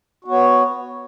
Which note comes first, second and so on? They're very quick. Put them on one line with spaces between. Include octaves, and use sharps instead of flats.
F#4 B3 C#5